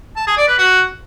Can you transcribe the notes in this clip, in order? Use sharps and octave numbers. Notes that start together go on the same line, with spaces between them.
A5
G#4
D5
B4
F#4